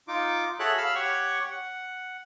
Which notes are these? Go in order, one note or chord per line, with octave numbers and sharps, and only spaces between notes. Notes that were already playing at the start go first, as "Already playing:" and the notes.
D#4 F4 D6
F#4 G#4 A4 C#5 E5 F#6
F5 B5 E6 F6
G4 C#5 F#5 C#6
F#5